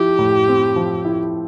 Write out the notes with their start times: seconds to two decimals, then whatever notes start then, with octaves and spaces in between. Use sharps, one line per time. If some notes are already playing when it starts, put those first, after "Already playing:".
Already playing: F3 E4 G4
0.19 A2
0.48 C4
0.76 F3
1.05 E4